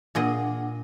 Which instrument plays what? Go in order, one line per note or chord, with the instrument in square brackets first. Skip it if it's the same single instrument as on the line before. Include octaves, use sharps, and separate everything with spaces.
[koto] A#2 G#4 D#5 [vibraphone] D4 F#5 D6